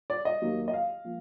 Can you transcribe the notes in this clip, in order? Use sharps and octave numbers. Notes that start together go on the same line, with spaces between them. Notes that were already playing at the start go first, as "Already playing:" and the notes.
D5
D#5
D#2 D#3 F#3 A#3
D#5
F5
F3 A#3